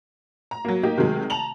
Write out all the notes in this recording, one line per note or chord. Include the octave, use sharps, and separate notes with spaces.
A#5
F#3 A#3
A#3 D#4 G4
C3 D#3 F#3 G#3
A5 A#5 F7 F#7